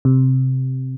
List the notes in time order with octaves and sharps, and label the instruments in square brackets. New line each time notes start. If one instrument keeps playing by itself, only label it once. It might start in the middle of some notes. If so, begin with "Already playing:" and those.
[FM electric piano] C3